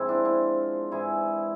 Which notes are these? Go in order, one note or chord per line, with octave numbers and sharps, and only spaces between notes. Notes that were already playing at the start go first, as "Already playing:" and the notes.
Already playing: G#2 F3 C4 E4 G#4
D4
D4 F4
G#2 E3 E4 G#4